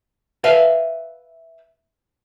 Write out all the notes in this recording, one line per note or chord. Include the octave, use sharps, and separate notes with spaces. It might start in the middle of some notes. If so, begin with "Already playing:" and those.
B4 E5 F5